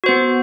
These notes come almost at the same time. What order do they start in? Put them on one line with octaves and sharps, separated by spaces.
F#4 C5 B3